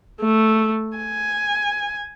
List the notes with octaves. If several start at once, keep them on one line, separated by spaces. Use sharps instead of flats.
A3
G#5